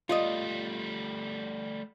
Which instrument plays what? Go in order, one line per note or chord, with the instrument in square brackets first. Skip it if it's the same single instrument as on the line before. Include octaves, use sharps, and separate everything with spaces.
[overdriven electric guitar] G3 A3 [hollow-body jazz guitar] F4 D5 D#5